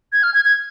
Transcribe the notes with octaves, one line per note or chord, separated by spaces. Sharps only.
G#6
F6
G#6
G#6